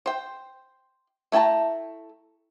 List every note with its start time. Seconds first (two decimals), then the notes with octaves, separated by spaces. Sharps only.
0.06 C5 G5
1.32 A3 E4 G5 A5 A#5